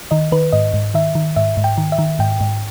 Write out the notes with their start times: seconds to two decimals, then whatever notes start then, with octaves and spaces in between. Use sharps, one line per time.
0.11 D#3 D#5
0.32 D#3 B4
0.53 G#2 D#5
0.74 G#2
0.94 D#3 E5
1.15 D#3
1.36 G#2 E5
1.57 G#2
1.64 G5
1.78 D#3
1.92 E5
1.99 D#3
2.19 G#2 G5
2.41 G#2